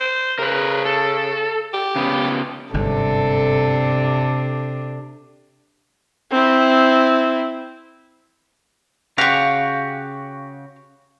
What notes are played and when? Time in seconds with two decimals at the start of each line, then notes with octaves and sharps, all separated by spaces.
0.01 C5
0.39 C#3 A#4 B4
0.86 A4
1.73 G4
1.96 C#3 B3
2.74 G1 G#2 C3 D4 A4
6.31 C4 E4
9.18 C#3 F#4 G4 F5 C#6